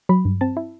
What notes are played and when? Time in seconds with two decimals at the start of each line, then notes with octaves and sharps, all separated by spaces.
0.09 F#3 B5
0.25 G2
0.41 C4 A5
0.57 E4